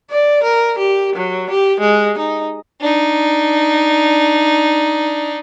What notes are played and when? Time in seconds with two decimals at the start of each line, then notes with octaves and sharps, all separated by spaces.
0.11 D5
0.44 A#4
0.79 G4
1.16 F#3
1.50 G4
1.81 G#3
2.19 D#4
2.81 D4 D#4